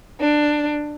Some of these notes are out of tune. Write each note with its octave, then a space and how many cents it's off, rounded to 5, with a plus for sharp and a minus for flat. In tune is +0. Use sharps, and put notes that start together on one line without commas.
D4 +15